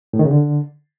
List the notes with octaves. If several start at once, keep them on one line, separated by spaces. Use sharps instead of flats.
A2
D#3
C#3
D3